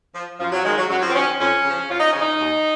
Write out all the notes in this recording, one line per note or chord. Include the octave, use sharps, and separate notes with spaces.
F3
F#2 F3
F#3
D#3 G#3
F#3
F#2 F#3
F3
C4
D#3 C#4
F2 C#4
C#3
F3
F2 F4
D#4
C#3 F3 C#4
D#4
D#2